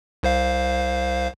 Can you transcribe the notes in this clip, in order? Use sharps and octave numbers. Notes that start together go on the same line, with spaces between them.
C2 C5 F5